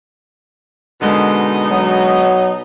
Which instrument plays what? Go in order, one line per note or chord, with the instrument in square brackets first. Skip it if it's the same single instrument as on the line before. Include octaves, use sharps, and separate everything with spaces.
[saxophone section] B2 D#4 [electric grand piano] D3 G#3 A#3
[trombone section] F#3